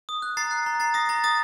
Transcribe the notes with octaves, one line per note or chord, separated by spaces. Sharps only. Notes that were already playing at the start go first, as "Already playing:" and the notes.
D#6
F#6
A#5 A6 C7
F#6
A#5
A#5 A6 C7
D#6 A#6
A#5 A6
D#6 A6